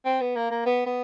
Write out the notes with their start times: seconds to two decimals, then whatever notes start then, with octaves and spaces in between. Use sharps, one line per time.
0.05 C4
0.21 B3
0.36 A#3
0.51 A#3
0.66 B3
0.86 B3